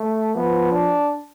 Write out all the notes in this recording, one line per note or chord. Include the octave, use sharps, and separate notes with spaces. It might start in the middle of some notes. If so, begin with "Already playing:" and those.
Already playing: A3
F3 B3
D4